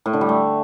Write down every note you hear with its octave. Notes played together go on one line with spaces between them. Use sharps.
A2
D3
G3
A3